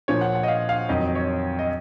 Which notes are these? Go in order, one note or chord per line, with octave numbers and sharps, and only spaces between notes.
A#2 F3 C#5
F#5
F#5
D#5
F5
F5
F2 D#3 F#3 D#5
C#5
D#5